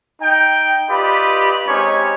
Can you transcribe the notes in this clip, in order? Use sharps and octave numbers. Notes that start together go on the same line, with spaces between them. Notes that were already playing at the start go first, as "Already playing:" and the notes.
D#4 G5
F4 G4 B4 D5 D#5 B5
G#3 C4 C#4 D#4 G4 C#5